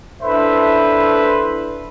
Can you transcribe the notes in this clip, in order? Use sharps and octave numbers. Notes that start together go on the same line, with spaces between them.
D4 E4 A4 B4 C5 E5